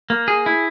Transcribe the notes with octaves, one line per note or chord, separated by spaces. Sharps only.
A#3
G#4
E4